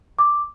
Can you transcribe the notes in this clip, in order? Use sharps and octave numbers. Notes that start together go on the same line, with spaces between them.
D6